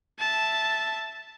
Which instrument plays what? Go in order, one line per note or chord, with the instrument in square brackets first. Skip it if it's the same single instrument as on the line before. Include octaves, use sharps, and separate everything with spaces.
[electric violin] E5 A5